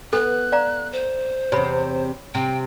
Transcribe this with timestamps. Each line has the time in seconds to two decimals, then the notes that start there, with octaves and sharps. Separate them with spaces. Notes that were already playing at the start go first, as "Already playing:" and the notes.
0.13 B3 A4 F#6
0.52 D5 F5 A#5
0.93 C5
1.52 E2 C3 C#5 B5
2.35 C3 G5